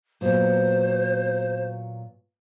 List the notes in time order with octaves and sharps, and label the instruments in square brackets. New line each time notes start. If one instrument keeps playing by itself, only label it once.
[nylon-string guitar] A#2 F#3 B3 [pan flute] C5